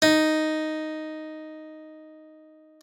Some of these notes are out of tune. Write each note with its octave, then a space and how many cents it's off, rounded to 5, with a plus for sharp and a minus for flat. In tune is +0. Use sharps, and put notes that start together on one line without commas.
D#4 +0